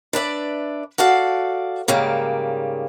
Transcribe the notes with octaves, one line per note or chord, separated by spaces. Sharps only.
D4 B4 D5 E5
F#4 A4 D5 F5
G#2 C#3 G3 A#3